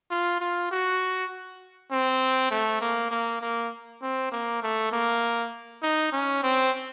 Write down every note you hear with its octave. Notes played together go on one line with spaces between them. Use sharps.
F4
F4
F#4
C4
A3
A#3
A#3
A#3
C4
A#3
A3
A#3
D#4
C#4
C4